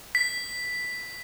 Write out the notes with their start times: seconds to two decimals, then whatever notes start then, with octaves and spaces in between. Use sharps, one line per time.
0.15 B6